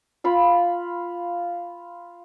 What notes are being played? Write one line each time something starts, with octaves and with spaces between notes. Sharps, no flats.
F4 F5 B5